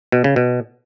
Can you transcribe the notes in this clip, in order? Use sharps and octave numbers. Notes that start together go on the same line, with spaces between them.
B2
C#3
B2